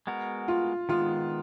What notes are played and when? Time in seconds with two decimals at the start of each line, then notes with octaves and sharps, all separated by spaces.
0.07 G#3 B3 F#4 A#4
0.48 F4
0.89 D#3 G#3 B3 F4